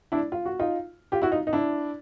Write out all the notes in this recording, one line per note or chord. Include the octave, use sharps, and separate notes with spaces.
D4 E4
F4
F#4
D#4 F4
F4 G4
E4 F#4
D#4 F4
D#4
D4 E4